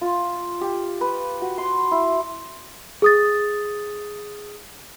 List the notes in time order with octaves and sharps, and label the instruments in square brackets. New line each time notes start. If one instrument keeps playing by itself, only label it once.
[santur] F4
G4
B4
F#4
C6
E4
[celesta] G#4 D#6 A6